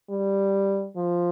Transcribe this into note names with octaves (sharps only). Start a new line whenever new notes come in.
G3
F3